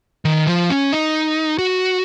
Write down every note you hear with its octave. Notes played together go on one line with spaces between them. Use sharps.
D#3
F3
C#4
D#4
F#4